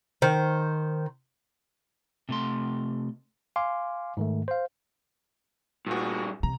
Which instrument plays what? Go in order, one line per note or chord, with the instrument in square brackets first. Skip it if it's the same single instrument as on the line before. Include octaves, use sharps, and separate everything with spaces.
[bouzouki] D#3 C5
[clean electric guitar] C3 A3 C6
[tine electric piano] F5 G#5 C6 D6
G#2 D#3 A3
C5 F5
[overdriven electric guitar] G2 G#4 [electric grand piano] A#2 F#4
[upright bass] C3 [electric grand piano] A#5